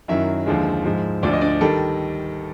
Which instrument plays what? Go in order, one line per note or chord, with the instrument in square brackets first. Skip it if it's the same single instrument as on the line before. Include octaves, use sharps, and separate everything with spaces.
[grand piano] F#2 D#3 F#3 E4 E5
D#2 D3 F3 G#3
G#2 F3 G#3
D2 D3 F3 D5
D#5
D4 D5
D#3 G3 A4